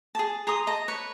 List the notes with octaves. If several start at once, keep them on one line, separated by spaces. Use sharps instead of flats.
G#4 A5
G#4 A#5 C6 D#6
D#5 A5 A#5
B4 C#5